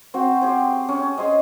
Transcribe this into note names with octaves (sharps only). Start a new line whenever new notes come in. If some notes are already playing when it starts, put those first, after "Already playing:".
C4 F#4 C5 F#5
G4 G#4 C5
C#4
G#4 C5 D#5